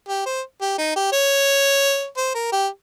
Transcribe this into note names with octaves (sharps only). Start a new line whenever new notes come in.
G4
C5
G4
D#4
G4
C#5
C5
A#4
G4